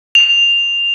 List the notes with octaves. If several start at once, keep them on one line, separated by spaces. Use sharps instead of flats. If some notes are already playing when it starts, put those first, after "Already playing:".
F7